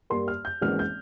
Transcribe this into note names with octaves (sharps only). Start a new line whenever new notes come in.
G2 G3 A#3 C6
F6
G6
G#1 G#2 E3 A#3 C#4 F6
G6